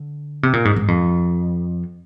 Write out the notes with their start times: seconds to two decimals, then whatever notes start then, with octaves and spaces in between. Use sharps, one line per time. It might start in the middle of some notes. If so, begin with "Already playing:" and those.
Already playing: D3
0.43 C3
0.53 A#2
0.65 G#2
0.76 G#2
0.88 F2